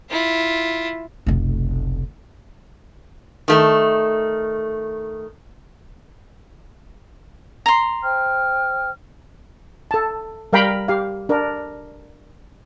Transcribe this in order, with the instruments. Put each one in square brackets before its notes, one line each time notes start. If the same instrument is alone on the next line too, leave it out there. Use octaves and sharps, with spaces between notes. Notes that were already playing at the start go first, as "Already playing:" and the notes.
[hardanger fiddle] E4 F4
[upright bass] F1 B1
[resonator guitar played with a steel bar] D#3 A3
[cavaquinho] A#5 C6
[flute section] C5 G5 F6
[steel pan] A4 A5
G3 A#4 F5 G5 A#5 B5
G4 F5
D4 A#4